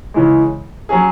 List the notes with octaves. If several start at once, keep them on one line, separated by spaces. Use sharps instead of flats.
C#3 E3 G#3
F#3 C#4 G#4